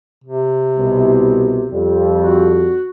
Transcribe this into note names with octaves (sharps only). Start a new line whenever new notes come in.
C3
C2 B2
F2 G3
F#4